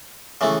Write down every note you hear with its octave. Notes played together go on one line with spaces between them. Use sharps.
C#3 E3 A3